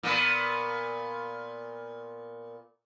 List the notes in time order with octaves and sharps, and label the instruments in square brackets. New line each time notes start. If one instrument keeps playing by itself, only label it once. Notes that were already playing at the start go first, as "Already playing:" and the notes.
[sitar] A#2 B3